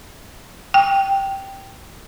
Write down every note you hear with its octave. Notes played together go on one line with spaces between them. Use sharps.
G5